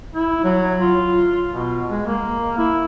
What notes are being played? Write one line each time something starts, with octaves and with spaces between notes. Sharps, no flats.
E4
F#3
F4
B2
G#3
A#3
E4